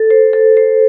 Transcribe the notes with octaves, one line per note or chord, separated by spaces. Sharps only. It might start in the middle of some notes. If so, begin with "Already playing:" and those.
Already playing: A4
C5
A4
C5